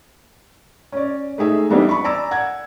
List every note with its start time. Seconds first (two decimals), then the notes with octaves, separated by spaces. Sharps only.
0.92 C#4 D5
1.38 A3 D#4 G#4 E5
1.70 E3 G3 B3 C4 D4 D#4
1.89 B5 C#6
2.04 D5 G#5 A#5 D6 E6
2.31 F#5 G#6